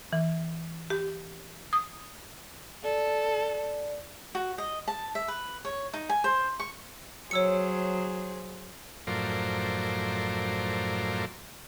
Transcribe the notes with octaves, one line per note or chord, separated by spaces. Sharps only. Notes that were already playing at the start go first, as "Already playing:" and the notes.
E3
G4
D#6
A4 D5
F#4
D#5
A5
E5
B4
C#5
D#4
G#5
C5
C#6
F#3 G#4 C5 C#5 E6 C#7
F#2 A2 F3 A#4 C5 D5